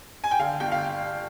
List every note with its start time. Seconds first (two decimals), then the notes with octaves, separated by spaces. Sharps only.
0.24 G#5
0.31 G5
0.39 D3 F5
0.60 G1 G5
0.72 F5